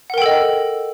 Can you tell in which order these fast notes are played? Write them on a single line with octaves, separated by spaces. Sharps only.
F#5 A#4 G5 A4 D#5